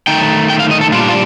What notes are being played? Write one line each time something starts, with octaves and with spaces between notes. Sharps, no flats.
D#3 A3 D#4 G5
G5
F5
D#5
A4
A#2 G3 D4 F4
F4